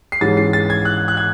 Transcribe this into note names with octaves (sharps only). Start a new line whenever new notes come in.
C7
G#2 E3 G#3 C#4 A6
C7
A6
G#6
F#6
F#6
G#6